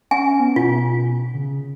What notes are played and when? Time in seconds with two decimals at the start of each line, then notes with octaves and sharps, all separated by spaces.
0.11 C#4 G#5
0.40 B3
0.56 B2 F4
1.34 C#3